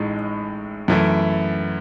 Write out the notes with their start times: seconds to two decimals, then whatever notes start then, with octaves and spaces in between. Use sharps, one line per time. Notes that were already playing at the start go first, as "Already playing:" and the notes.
Already playing: A1 A2 G#3 D#4
0.88 F#2 E3 A3 E4